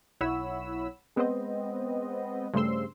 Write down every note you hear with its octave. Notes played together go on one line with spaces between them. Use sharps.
B1 E4 C#5 F#5 B5 E6
G#3 B3 C4 B4 C5 D#5
G2 C#3 A3 C5 C6 E6